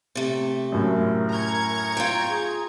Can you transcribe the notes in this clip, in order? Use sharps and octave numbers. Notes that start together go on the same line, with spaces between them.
C3 A3
F#2 A2 A#4
A#5 C#6 G#6
F4 G5
G#4